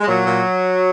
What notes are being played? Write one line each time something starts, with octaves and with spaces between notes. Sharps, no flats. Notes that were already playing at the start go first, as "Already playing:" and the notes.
G#3
A#2 F#3
A#2